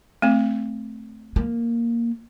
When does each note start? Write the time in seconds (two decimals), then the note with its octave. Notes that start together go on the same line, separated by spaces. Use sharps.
0.22 A3 C4
1.36 A#3